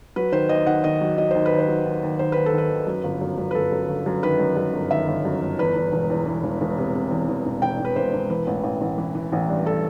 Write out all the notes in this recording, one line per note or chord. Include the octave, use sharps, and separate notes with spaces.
F#3 B4
D#3 C5
D#2 D#5
D#3 F#5
D#3 D#5
F#3
F#3 D#5
D#2 C5
B4
D#2
C5
F#3
D#2
D#2
D#2 C5
D#2 B4
A4
D#3
B4
D#2
F#2
G1
F#2
F#2
B4
G1 A4
F#2
G1
F#2
D#3 B4
F#2
F#2
G1
D#3 E5
G1
F#2
G1
E2 B4
E2
E1
E2
E3
E1
E1
C3
C3
E2
E2
E1
E1 G5
E1
B4
E1 C5
E1
E3 B4
A1
A1
A1
E3
E3
A1
G2
A4